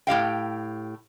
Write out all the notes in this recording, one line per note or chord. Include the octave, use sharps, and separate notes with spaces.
A2 G4 F5 G5